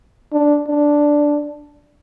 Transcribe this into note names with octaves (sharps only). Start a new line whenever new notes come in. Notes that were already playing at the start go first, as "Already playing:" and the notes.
D4
D4